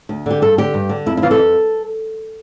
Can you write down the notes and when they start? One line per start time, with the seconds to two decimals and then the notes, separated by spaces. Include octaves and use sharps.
0.09 D2
0.26 D3 G4
0.42 G2 A4
0.58 D3 G4
0.74 G2
0.89 D3
1.06 F2 E4
1.17 E4
1.22 C3 E3 F4
1.31 A4
1.38 F2